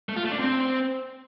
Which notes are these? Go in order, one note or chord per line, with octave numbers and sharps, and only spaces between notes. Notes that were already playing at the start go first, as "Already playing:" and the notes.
A3
F4
A3
D4
C4